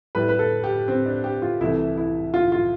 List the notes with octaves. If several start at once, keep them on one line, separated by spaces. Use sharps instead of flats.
A2 G3 B4
B4
A4
G4
C4
D4
G4
F4
C2 C3 E3 A3 E4
E4
F4
F4